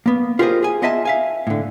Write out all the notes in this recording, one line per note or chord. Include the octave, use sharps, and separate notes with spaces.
A#3 B3
F4 G4 G#4 A#4 C5 D#5
G#4 G#5
B3 F4 D#5 E5 G#5 A5
E5 F5 G#5
A2 D3